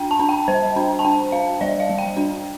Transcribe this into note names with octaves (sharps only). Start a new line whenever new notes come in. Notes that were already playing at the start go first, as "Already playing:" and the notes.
Already playing: D4 G5
A5
D4
G5
G3 C5
D4
A5
D4 G5
D4 F5
G3 D5
F5
G3
G5
D4